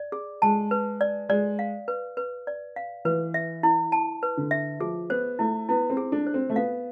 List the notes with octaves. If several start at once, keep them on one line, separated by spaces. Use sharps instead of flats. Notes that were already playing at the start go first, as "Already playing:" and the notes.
Already playing: D5
G#4
G#3 A5
B4
D5
G#3 D5
F5
B4
B4
D5
F5
E3 B4
E5
E4
A5
B4
D3
E5
F3 G#4
B3 C5
A3 E4
B3 E4
C4
G#4
D4
C5
C4
A3
B3 F5